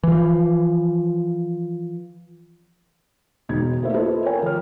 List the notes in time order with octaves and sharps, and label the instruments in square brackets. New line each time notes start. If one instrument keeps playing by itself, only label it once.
[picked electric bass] E3 F3
[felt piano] E1 D#4 G#6
A3 A#3 E4 C5 E5
E4 F4 A4 B4 C5 D#5
A#4 C#5 G5 G#5
F3 F6